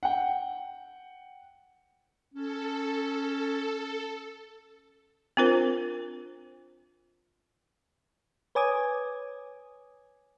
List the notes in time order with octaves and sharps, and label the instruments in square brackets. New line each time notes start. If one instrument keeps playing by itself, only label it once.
[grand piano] F#5 G5
[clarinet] C#4 [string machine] A4
[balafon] C4 D4 F4 A#4 C5
[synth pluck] B4 C#5 G#5 D6 D#6 G#6